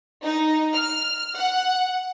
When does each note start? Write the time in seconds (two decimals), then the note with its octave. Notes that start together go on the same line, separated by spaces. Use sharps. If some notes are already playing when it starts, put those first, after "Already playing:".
0.23 D#4
0.73 F6
1.35 F#5